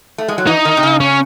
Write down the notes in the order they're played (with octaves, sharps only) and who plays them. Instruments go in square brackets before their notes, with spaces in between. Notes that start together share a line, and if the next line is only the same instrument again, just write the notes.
[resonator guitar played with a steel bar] A3
G#3
F#3
[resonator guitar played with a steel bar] E3 [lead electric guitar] D#4
[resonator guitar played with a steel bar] D#3
C3
C#3
[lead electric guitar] C#4